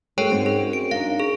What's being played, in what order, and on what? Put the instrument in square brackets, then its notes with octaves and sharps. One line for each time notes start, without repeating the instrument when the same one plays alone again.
[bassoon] F#2 [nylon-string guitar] A3 [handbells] G#4 C#5 G5
[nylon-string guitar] G#2 C4 F#4
[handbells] G#4
D7
[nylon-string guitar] D4 D#4 [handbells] F5
[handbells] G#4